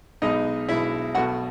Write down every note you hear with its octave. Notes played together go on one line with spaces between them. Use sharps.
B1 B2 G#3 D#4 D#5
B1 B2 G#3 E4 E5
B1 B2 A3 F#4 F#5